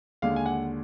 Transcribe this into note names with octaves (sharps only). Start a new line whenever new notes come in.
D#2 D3 G#3 F5
G#5
F#5